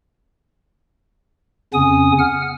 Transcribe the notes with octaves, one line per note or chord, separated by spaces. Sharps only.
F2 C#3 B3 C#4 G#5 D#6
F#5 F6